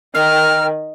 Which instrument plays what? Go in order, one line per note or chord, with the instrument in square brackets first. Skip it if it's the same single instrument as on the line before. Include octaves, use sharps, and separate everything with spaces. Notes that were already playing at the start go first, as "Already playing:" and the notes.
[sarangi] D#3 [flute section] A#4 G5 [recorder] F6